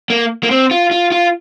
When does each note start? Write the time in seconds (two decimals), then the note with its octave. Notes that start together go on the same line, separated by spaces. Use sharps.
0.10 A#3
0.43 A#3
0.51 C4
0.71 F4
0.91 F4
1.12 F4